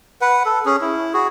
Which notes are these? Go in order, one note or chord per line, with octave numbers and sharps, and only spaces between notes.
B4 F#5
A4
C#4 G#4
E4
F#4 G#4